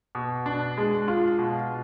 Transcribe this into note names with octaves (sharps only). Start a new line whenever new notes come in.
B2
D4
G#3
F4
B2